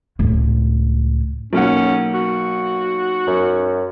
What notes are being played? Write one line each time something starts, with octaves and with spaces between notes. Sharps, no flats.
C#2 A2
B1 A#3 C#4 F#5
F#4
F#2